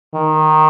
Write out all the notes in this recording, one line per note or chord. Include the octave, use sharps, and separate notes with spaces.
D#3